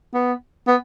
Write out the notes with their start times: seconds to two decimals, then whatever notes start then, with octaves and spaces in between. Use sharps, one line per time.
0.14 B3
0.67 B3